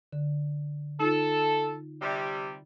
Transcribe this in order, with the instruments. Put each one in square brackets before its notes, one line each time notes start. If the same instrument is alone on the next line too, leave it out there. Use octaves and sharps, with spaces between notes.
[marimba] D3
[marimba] D#4 F4 [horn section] A4
[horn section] C3 G3